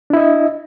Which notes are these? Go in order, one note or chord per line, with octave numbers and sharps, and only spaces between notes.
D4 E4 D#5 E5